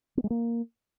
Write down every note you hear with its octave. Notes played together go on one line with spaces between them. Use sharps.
B3
G#3
A#3